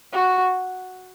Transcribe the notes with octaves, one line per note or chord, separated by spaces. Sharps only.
F#4